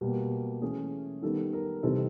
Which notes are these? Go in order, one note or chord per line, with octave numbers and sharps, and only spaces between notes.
B2 G3 A#3 G4
E3 A3 C#4 G#4
D#3 G3 B3 A4
A#4
C3 E3 G3 C4 D#4 A4